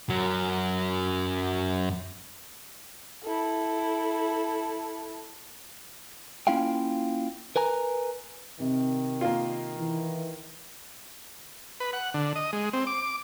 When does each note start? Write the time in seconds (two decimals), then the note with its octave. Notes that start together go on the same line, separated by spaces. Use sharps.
0.09 F#2 F#3
3.23 E4 A4
6.47 A#3 C#4 E4 F4 F5 G5
7.56 A#4 B4 G#5 A#5
8.60 C3 D#3
9.21 A#3 F4
9.78 E3
11.80 B4
11.93 F#5
12.14 D3
12.36 D#5
12.53 G#3
12.73 C4
12.87 D6